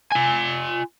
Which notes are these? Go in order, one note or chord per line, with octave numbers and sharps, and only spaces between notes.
F4 G#5